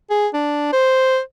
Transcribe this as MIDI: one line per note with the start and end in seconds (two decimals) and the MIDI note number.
0.10 0.27 68
0.34 0.70 62
0.73 1.20 72